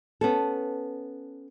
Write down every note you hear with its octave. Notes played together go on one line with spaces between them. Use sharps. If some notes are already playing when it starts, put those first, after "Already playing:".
B3 C#4 A4